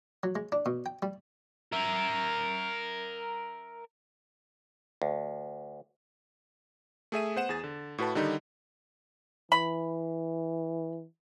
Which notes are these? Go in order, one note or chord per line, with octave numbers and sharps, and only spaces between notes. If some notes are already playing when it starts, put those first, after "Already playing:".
F#3
G#3
D4
B2
G5
G3
A#4 E5
D2
A3 G#4 E5 D#7
B3 C5 F#5 E7
E2 G#4 A6
D3
A2 F#4 B4 A5
D3 D#3 G3 D#4
E3 B5